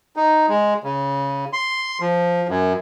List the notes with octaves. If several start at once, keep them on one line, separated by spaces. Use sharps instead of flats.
D#4
G#3
C#3
C6
F3
F#2